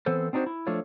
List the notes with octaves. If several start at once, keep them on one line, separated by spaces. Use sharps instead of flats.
E3 B3 C4 A4 C5
C4 D4 D#4 F#4 C5
E4
F3 A3 D4 F4 C#5